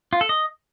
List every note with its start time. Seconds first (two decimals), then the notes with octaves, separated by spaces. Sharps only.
0.13 F4
0.21 A4
0.29 D#5